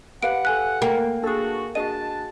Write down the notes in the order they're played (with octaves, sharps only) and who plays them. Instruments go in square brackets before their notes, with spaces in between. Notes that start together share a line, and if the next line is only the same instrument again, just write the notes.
[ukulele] G4 B4 F5 [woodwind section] F#5 [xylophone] D7
[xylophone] A4 G#5 F#6
[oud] A#3 [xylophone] G5
[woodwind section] D4 F#4 [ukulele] G#4 A4
[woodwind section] D4 A5 [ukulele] F#4 G#4 D#5 [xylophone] D#7